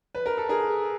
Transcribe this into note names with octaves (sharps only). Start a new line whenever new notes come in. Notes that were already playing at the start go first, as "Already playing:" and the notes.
B4
A#4
A4
G#4 A#4